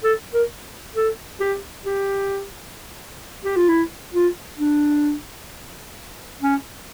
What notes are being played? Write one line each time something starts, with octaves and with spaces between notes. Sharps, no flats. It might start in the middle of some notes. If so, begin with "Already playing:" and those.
A4
A#4
A4
G4
G4
G4
F4
E4
F4
D4
C#4